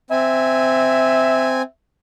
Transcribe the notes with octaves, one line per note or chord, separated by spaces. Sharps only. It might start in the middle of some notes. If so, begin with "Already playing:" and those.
C4 E5 G#5